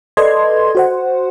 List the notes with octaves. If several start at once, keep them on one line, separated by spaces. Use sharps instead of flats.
A4 B4 D5 D#5 C6 G#6
F#4 C5 F#5